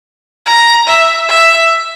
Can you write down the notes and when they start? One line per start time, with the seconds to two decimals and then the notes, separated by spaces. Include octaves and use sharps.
0.46 A#5
0.87 E5
1.29 E5